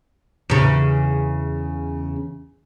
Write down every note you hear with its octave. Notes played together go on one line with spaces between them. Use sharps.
E2 C#3